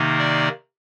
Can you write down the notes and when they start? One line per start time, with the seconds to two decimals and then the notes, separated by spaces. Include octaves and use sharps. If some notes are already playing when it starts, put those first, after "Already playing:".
Already playing: C3 D#3 A#3 D#4
0.19 D5